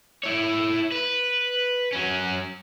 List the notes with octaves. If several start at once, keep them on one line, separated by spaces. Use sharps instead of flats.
E4 C#5
B4
F#3 C#4